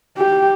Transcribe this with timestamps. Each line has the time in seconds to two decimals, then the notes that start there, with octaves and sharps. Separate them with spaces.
0.18 G4